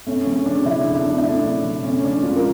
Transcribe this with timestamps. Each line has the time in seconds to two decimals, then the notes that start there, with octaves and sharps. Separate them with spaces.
0.07 A3 C#4
0.26 C#3 C#4
0.46 C#3 D4
0.65 C#3 E4
0.81 A3 D4
0.95 D4
1.06 C#3 D4
1.18 E4
1.24 A3 D4
1.45 C#3
1.65 C#3
1.84 A3 C#4
2.04 C#3 D4
2.23 C#2 F4
2.36 A#4